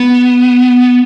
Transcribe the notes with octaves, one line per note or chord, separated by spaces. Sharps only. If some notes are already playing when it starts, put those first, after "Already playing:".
Already playing: B3